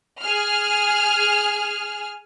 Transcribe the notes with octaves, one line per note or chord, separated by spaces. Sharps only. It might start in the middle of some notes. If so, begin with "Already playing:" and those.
G#4 F6